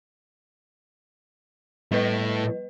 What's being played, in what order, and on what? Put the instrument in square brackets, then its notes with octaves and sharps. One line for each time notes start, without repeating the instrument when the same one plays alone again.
[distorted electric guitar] A2 A3 [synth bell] G3 B4 D#5